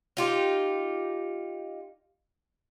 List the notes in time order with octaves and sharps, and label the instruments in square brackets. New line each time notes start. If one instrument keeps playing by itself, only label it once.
[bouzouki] D#4 F4 G4